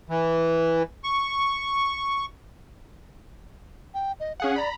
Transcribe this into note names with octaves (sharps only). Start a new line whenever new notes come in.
E3
C#6
G5
D#5
C#4 G#4 F5 F#5
D5 A#5 B5